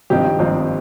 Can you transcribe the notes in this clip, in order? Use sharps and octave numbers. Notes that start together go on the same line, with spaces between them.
G#1 G2 F3 C4 D#4 G4
G#1 G2 F3 C4 D#4